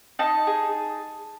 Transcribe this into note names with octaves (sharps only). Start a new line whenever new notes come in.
D#4 A5
G#4